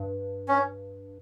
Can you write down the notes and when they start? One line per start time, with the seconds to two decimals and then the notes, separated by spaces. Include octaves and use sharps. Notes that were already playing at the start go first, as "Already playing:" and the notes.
Already playing: G2
0.48 C#4